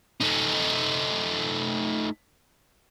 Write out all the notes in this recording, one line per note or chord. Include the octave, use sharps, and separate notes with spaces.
A3 D#4